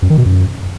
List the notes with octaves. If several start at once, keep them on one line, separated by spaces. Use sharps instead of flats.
F#2
D#3
B2
F#2